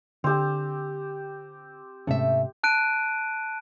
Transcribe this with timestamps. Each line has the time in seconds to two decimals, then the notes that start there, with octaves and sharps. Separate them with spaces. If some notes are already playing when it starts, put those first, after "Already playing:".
0.24 D3 C4 G4
2.07 G#2 C3 A3 C#4 E5
2.63 A5 F#6 D7 D#7